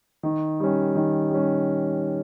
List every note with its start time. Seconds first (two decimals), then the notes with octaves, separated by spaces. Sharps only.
0.23 D#3
0.60 G3 C#4
0.95 D#3
1.30 G3 C#4